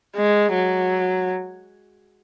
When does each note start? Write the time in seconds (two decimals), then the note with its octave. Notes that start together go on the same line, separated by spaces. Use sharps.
0.16 G#3
0.53 F#3